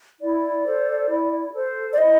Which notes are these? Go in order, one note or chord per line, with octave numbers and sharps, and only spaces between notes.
E4 D5
A4 C5
E4
A4 C5
D5
E4 D#5